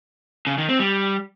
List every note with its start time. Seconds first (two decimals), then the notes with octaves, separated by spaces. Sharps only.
0.47 C#3
0.58 D#3
0.69 C4
0.80 G3